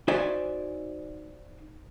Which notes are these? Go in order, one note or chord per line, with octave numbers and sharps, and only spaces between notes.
D#4 F#4 C5 D5 E5 G#5